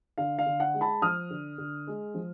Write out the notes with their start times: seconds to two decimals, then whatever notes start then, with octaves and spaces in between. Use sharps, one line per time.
0.18 D3 F5
0.39 F5
0.46 D3
0.60 F#5
0.74 G#3
0.81 A5 B5
1.02 F3 D#6 F6
1.31 D3
1.58 D3
1.87 G#3
2.14 F3